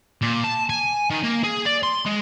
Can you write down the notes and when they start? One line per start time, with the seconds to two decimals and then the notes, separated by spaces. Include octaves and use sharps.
0.22 A#2
0.44 A5
0.70 G#5
1.10 D#3
1.23 A#3
1.43 G#4
1.66 D5
1.83 C6
2.06 G#3